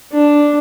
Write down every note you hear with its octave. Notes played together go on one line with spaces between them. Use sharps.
D4